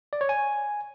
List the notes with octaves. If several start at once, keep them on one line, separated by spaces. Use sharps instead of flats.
D5
C#5
G#5